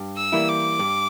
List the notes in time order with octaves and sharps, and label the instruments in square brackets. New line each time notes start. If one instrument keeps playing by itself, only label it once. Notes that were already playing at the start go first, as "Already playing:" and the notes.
Already playing: [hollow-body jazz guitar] G2
[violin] E6
[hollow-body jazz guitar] E3 G3 A#3 E4
[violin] D6
[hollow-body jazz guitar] G2